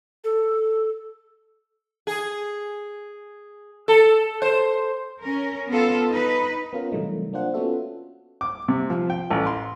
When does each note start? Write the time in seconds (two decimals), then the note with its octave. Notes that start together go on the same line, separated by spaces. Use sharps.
0.24 A4
2.07 G#4
3.88 A4
4.42 C5
5.22 C#4 A#4
5.68 B3 F4 A4
6.09 D#4 B4
6.73 B3 C#4 F4 A#4
6.92 C3 E3 F#3 G3 A3 D#4
7.33 A#3 D4 F4 C5 F#5
7.54 B3 C#4 F4 F#4 A4 E5
8.41 D6
8.68 C3
8.90 F3
9.10 G5
9.30 A1
9.47 C6